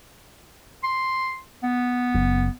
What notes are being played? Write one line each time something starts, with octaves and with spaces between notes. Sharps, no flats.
C6
B3
F#1 F#2